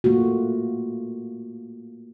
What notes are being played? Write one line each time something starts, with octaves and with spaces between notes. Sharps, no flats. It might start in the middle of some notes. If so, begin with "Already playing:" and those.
A3 A#3 F4 F#4